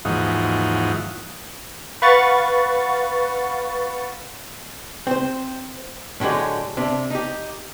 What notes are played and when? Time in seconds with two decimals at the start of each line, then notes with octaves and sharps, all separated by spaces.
0.05 D#2 G#2 E3 F3 D#4 F#4
2.02 B4 F5 F#5 C#6 A6
5.07 C4 C5
6.20 A2 D3 F#3 G#3 G4
6.77 C3 D4
7.10 D#4 G4